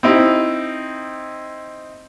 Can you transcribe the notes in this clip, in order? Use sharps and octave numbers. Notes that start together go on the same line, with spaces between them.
C4 D#4 E4